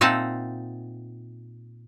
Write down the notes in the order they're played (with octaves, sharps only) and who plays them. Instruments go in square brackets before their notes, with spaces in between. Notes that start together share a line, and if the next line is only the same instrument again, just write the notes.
[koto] A#2 C4 D#4 E5 F#5 A5